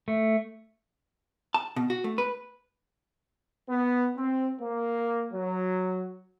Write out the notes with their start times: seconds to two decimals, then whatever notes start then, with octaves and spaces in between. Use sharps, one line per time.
0.08 A3
1.54 A5
1.76 B2
1.90 F#4
2.04 A3
2.18 B4
3.69 B3
4.17 C4
4.60 A#3
5.33 F#3